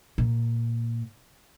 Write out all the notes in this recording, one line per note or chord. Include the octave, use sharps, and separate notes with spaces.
A#2